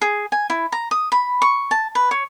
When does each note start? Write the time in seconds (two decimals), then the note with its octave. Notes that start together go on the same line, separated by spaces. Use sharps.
0.01 G#4
0.32 G#5
0.50 E4
0.72 A#5
0.91 D#6
1.12 B5
1.42 C#6
1.71 A5
1.95 B4
2.11 C#5